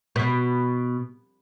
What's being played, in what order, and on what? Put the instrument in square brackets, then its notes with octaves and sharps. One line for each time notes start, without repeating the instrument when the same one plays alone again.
[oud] B2